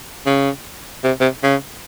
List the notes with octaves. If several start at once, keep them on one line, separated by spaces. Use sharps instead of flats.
C#3
C3
C3
C#3